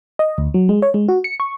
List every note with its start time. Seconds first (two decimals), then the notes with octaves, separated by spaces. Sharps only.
0.19 D#5
0.38 D2
0.54 F#3
0.69 G#3
0.82 C#5
0.94 G#3
1.08 F#4
1.24 C#7
1.40 C#6